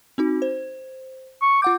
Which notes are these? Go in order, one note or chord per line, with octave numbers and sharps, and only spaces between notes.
C4 D#4 F#4
C5
C#6
F4 F#5 D6 G6